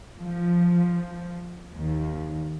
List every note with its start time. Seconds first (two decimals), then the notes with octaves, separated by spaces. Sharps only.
0.21 F3
1.74 D#2